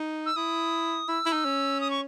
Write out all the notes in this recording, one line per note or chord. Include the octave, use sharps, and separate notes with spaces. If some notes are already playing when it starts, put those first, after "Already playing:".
Already playing: D#4
E6
E4 D#6
E4 E6
E4
D#4
C#4
D#6
C#6